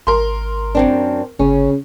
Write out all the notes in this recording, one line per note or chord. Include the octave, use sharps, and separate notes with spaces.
G#1 A#4 C6
F#2 C4 D4
G1 C#3 C#4